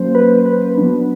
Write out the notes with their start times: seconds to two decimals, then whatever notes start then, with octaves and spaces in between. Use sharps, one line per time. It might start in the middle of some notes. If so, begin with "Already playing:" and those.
Already playing: F#3 A#3 C#4 C5
0.15 B4
0.31 B4
0.46 B4
0.77 F#3 B3 D4